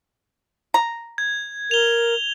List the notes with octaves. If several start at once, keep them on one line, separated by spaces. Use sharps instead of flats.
A#5
G#6
A#4 F7 G7